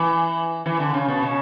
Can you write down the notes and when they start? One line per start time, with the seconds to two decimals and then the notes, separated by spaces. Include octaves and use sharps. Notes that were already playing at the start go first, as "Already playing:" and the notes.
Already playing: E3
0.66 E3
0.80 D3
0.94 C#3
1.08 B2
1.23 C#3